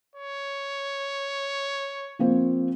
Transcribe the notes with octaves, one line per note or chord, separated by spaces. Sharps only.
C#5
F3 A#3 C4